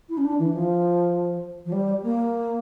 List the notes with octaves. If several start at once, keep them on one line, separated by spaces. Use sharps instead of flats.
E4
C#4
D4
E3
F3
F3
G3
A#3